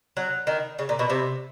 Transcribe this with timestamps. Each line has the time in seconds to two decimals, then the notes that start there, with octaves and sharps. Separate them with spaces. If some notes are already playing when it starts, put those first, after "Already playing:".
0.17 F#3
0.47 D#3
0.79 C#3
0.89 A#2
0.99 B2
1.10 C3